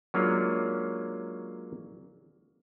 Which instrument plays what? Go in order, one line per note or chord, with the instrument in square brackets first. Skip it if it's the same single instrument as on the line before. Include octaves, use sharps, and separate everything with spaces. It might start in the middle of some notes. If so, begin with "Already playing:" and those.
[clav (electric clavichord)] F#3 G#3 A#3 C#4 D4 F4